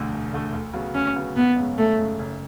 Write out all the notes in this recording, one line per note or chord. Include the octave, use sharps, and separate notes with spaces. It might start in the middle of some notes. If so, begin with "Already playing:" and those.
Already playing: E1 D2 D3 A3
E1
D2 D3 A3
D2
C#3 F#3 B3
D2 C#4
C#3 F#3 B3
G#1 B3
F#2 C#3 G#3
G#1 A3
F#2 C#3 G#3
F#1